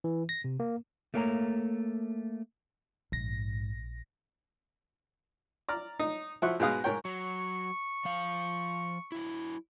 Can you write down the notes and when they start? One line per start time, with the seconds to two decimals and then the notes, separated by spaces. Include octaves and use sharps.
0.04 E3
0.29 A#6
0.44 C3
0.60 A#3
1.14 A3 A#3 A#4 C#5 G#5 A#5
3.12 A#1 G#2 A#6
5.69 D5 A#5 F6
5.99 D#4
6.42 F3 E4 F#4 C#6 F#6
6.60 G#2 B2 G#3 F5 D#6
6.84 G#2 A#4 C#5 G5
7.05 F#3 C#6
8.05 F3 F5
9.12 F#3 E4